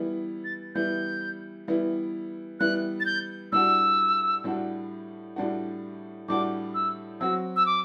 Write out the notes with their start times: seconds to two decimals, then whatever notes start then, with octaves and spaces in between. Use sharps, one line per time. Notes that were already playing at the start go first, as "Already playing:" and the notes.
Already playing: E3 G3 B3 E4
0.44 A6
0.75 E3 G3 B3 E4 G6
1.68 E3 G3 B3 E4
2.60 E3 G3 B3 E4 F#6
3.00 A6
3.05 G6
3.52 A2 G3 D4 F#4 E6
4.44 A2 G3 D4 F#4
5.36 A2 G3 D4 F#4
6.28 A2 G3 D4 F#4 D6
6.74 E6
7.20 F#3 C4 F#4 E6
7.56 E6
7.66 D6